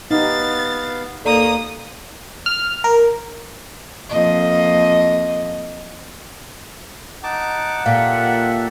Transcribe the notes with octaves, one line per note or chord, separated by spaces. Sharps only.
B3 D#4 G4 F5 A6
D#2 A#3 A4 D5 A#5 D#6
F6
A#4
F2 A#3 D#5
D#4 F#5 A5 D6
A#2 G4 A4 E5 F5